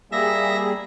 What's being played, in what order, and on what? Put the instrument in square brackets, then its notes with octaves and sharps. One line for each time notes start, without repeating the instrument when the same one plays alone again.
[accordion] G3 A#3 G#4 [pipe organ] E5 A#6